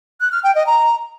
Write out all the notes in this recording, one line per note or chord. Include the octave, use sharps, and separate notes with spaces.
F#6
F6
G5
D#5
A#5